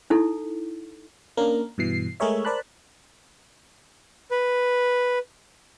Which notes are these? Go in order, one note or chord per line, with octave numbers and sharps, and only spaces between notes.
D#4 E4 A4
A#3 C#4 D4 A#4
G2 B2 E3 C7
G#3 A3 G#4 A#4 C#5 E5
A#4 C5 D5 A5 B5 F#6
B4